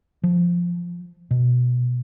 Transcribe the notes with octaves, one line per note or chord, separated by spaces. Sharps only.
F3
B2